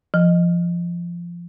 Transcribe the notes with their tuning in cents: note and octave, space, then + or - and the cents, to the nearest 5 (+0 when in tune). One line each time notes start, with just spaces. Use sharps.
F3 -15